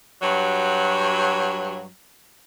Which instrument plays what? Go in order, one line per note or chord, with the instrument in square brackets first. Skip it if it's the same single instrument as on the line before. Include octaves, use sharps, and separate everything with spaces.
[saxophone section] G2 F#3